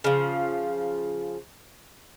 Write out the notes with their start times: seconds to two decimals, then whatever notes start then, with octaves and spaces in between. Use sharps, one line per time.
0.04 C#3 F3